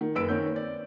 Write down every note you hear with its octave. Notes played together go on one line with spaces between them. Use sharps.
D#3
F#1 B4 E6 D7
D#3 C4 C#4 G6
D5